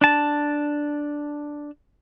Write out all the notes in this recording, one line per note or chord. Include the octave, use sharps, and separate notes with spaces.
D4 A5